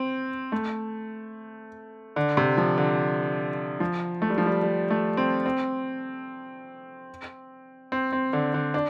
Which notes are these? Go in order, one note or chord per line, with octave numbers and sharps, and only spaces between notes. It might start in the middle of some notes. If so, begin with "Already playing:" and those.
Already playing: C4
A3
D3
C3
F3
D3
F3
A3
G3
F3
G3
G3
A3
C4
C4
C4
C4
D3
D3
D4